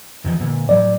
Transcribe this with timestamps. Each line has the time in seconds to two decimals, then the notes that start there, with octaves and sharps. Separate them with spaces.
0.24 E2 D#3 F3
0.39 A#2 D3
0.69 A2 F#3 G3 D5